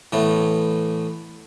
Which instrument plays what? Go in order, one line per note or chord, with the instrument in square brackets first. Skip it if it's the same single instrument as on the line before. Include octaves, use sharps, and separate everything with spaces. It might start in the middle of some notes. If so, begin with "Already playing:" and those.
[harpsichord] A2 E3 A3 B3